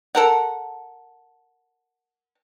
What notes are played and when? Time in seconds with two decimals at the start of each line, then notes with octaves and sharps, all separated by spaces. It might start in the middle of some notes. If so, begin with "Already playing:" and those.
0.15 A4 A#4 F#5